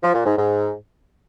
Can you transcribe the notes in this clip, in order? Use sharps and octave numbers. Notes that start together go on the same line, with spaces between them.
F3
A#2
G#2
G#2